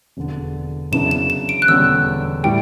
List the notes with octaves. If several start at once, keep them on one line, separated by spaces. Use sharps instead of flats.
E1 E2 D3
F#2 C#3 E3 B3 D4 E7
E7
E7
D7
F#6
E1 E2 D3 G3 C#4 E6
A2 E3 G3 G5